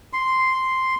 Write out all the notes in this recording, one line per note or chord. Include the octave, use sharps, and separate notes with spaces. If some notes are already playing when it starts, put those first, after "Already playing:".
C6